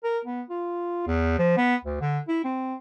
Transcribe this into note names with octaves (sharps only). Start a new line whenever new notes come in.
A#4
B3
F4
E2
F3
B3
D2
D3
E4
C4